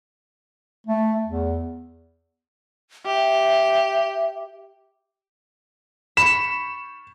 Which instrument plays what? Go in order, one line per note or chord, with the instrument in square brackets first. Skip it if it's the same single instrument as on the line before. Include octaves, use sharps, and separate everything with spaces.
[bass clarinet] A3
E2
[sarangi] G4 [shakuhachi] E5
[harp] B5 C#6 [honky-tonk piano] E7